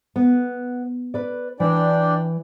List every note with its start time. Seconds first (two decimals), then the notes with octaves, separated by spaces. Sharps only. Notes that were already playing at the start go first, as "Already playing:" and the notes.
0.16 B3
1.14 B4 D5
1.60 E3 D4 D5 G5